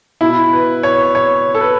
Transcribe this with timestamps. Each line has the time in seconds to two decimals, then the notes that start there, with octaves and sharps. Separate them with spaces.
0.21 B2 E4
0.53 B4
0.83 C#5
1.15 C#5
1.55 A4
1.61 B4